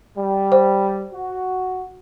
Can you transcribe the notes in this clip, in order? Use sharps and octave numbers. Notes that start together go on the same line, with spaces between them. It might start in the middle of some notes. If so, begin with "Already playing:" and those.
G3
C5
F#4